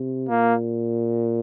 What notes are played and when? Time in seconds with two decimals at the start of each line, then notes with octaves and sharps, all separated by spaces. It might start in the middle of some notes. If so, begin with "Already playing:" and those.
Already playing: C3
0.29 A#2 A#3